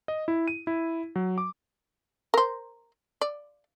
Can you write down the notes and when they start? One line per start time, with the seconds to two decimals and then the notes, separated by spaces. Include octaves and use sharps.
0.08 D#5
0.28 E4
0.48 D#7
0.67 E4
1.16 F#3
1.38 D6
2.34 A#4 C5
3.21 D5